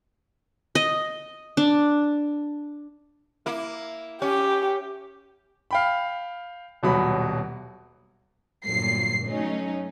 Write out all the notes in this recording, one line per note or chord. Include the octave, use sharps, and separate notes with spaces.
D#5
D4
A#3 E4
C#4 G4
F5 G5 B5
D#1 B2 F#3 B5
G1 G2 A#2 F#3 C7
F#3 A3 C#4 D#4